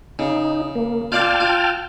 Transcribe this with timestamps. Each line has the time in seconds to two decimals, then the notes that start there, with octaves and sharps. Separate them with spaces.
0.19 C#3 D#4
0.75 A#3
1.12 F4 D5 F5 G5 A5 F6
1.40 F4